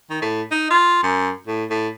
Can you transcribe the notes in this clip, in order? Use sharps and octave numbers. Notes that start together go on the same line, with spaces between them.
D#3
A2
D#4
F4
F#2
A2
A2